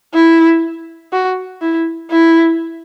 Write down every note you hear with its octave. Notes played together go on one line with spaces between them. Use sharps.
E4
F#4
E4
E4